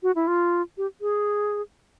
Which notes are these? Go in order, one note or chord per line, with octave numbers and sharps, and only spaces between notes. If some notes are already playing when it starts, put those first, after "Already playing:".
F#4
E4
F4
G4
G#4